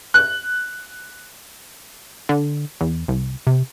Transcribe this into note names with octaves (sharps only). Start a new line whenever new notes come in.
F#6
D3
E2
C2
C3